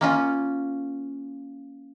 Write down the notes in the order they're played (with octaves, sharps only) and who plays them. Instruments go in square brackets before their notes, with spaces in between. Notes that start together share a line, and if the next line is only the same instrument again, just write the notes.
[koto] A#3 C#4 F4